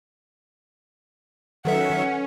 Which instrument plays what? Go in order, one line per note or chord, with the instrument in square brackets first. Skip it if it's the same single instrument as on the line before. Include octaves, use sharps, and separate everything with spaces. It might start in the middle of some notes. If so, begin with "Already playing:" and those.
[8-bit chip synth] D#3 F#3 E5 [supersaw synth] C#4 [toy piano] G4 A4 B4 [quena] F#5